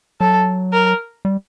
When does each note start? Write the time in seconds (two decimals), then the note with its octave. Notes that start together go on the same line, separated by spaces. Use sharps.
0.20 F#3 A4
0.73 A#4
1.25 G3